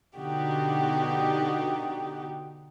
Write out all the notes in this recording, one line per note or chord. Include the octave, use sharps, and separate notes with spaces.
B2 D3 D#4 F#4 G4